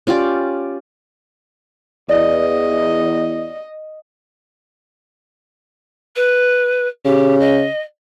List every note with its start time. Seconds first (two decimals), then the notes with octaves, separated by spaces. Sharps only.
0.07 C#4 F4 G4 D5
2.09 E2 D5 D#5
6.16 B4
7.05 C#3 G4
7.40 D#5